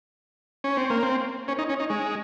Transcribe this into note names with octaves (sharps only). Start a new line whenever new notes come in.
C#4
C4
A#3
C4
C#4
D#4
C#4
D#4
G#3